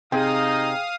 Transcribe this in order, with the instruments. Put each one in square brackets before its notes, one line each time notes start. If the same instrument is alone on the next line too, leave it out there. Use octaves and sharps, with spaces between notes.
[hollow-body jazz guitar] C3 [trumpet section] D#4 [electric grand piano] G#4 G5 [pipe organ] F5 D#6